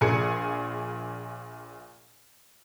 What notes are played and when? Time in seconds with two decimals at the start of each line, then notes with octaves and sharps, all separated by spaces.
0.01 A#1 A#2 G#4 G#5 C#7